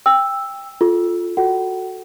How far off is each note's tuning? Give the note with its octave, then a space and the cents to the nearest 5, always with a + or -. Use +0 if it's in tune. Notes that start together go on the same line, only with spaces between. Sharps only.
G5 +20 E6 +0
F4 +5 A4 -20
F#4 -10 A4 +0 F#5 +40